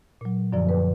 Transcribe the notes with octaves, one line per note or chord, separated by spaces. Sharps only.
A#2 F#3
F#2 D3 F3 D5
B4